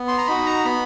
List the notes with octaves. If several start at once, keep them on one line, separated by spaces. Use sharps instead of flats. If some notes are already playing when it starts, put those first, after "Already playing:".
Already playing: B3
C6
A#5
D#4 F#4 B5
A#5
B3 B5